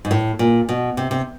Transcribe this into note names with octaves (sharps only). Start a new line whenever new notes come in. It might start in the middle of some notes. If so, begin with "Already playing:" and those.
G#2
A2
A#2
B2
C3
C3